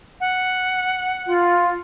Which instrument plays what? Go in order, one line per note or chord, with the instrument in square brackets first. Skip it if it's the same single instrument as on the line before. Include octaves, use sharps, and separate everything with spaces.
[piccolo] F#5
[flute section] F4